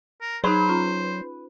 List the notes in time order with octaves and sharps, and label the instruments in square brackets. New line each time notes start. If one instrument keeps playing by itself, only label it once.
[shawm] A#4
[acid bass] F#3 [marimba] D#4 G#4 [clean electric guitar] B4 [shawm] C5
[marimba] C#4 F4